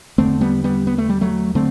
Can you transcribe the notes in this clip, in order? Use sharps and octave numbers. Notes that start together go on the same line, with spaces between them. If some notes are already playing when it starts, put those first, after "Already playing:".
E2 D3 A3 C4
G3 B3
G3 B3
B3
A3
G3
F#3 A3
D3 A3 C4